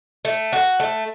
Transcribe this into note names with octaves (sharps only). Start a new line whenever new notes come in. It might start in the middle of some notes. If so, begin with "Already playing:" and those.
A3
F#4
A3